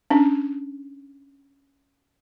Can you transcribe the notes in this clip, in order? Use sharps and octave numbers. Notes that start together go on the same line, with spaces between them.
C#4 D4